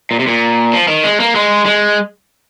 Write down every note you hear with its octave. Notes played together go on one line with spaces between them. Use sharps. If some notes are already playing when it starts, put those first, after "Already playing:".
A#2
C3
A#2
F3
D#3
G#3
A#3
G#3
G#3